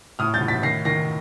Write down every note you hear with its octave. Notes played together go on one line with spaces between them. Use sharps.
A2 D#6 F6
G6 A6
A2
A6 B6
D#3 A#6 C7
D#3 A#6 C7